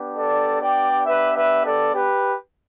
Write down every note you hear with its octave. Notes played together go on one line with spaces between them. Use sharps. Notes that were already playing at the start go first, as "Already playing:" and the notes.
Already playing: B3 D4 G4
A4 D5
D5 G5
B4 E5
B4 E5
A4 D5
G4 B4